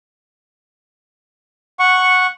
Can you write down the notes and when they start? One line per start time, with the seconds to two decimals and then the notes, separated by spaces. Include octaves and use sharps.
1.79 F#5 C#6